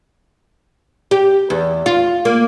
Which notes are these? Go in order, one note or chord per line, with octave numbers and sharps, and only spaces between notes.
G4
E2
F4
A#3